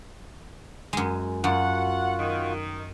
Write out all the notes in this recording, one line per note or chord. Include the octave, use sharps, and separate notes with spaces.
F#2 G#3
F#2 F4 F#4 F#5 F#6
D#3